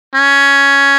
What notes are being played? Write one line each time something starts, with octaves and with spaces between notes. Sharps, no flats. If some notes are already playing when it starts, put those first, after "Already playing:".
C#4